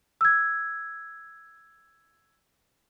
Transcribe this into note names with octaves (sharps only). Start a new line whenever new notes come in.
E6 G#6